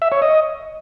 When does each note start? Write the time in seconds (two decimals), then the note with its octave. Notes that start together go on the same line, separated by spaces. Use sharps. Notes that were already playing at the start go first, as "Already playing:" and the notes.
0.02 E5
0.12 C#5
0.22 D#5